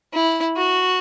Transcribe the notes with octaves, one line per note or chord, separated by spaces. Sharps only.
E4
F#4